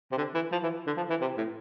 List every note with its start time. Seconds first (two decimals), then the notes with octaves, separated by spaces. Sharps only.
0.11 C3
0.17 D3
0.34 E3
0.52 F3
0.63 E3
0.87 D3
0.97 F3
1.10 E3
1.21 C3
1.37 A2